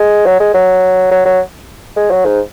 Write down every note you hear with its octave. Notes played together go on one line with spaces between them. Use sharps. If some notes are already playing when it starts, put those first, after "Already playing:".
Already playing: G#3
F#3
G#3
F#3
F#3
F#3
G#3
F#3
G#2